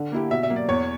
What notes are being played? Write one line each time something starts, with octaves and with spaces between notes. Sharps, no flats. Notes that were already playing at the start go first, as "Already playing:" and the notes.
Already playing: D3
A#3 E4 G4
B2 E5
E5
F#3 A#3
D5
E2 C#5